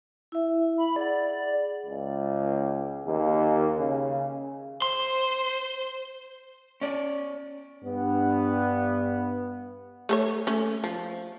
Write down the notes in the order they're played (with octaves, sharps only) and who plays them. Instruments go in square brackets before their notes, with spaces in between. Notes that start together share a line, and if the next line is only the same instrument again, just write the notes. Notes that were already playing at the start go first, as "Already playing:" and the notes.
[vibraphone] E4 E5
[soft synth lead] B5
[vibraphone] G#4 F#5 [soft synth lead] D5
[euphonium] C#2
D#2
C#3
[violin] C5 [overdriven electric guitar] C6
[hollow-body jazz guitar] C#4 D5
[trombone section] G2 B3
[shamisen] A3 A4 C#5
A3 C#4
F3